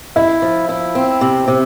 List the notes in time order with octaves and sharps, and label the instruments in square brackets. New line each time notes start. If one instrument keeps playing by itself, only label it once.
[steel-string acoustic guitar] E4 [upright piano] E5
[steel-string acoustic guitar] F3
E4
C4
C3
C3